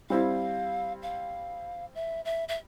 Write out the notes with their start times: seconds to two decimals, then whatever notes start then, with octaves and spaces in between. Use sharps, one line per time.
0.10 G3 C4 E4 F5
1.02 F5
1.95 E5
2.25 E5
2.48 E5